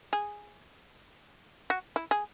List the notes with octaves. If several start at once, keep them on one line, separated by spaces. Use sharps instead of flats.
G#4
F#4
E4
G#4